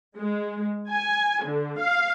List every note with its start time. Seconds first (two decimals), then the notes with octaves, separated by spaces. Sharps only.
0.17 G#3
0.89 G#5
1.43 D3
1.79 F5